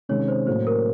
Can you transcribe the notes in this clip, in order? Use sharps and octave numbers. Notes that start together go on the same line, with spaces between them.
C3 D#3 G#3 C#4 C#5
C5
A2 F#3 A#3 C5
A#4